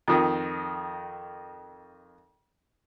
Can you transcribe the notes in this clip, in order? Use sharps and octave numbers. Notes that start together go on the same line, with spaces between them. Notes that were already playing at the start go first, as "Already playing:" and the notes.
F2 D#3